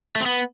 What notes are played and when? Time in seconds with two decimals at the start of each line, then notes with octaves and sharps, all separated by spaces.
0.16 A3
0.21 C4
0.26 B3